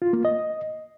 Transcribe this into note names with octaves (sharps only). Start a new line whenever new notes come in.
F4
A#3
D#5